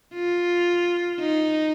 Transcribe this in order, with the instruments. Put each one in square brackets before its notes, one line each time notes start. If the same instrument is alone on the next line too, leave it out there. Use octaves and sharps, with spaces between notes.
[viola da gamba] F4
D#4